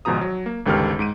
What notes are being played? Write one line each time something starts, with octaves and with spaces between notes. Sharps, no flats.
G#1 G#2 B2 F3 A#5 D#6
F#3
A#3
G1 C#2 D#3 G4 A4 F6
G#2 D7 D#7